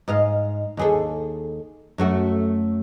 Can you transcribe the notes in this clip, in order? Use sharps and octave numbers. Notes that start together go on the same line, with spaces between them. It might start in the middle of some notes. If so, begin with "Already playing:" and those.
G#2 D#5 F5
D#2 G#4 A4
F#2 A3 F#4